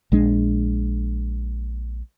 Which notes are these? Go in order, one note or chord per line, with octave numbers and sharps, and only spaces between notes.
A#1 G#3 D4